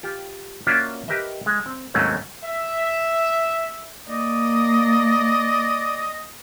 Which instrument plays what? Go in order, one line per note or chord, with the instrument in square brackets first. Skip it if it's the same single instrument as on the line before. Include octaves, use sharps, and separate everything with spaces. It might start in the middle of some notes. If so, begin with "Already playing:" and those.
[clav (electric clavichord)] F4 G4
A#3 C#4 F4 F#4 D5 E5
G4 A#4 B4 D#5 E5
G#3
C4
D#2 G#2 F#3 A3 C4 C#4
[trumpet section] E5
[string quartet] A#3 [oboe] D5 [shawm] D#5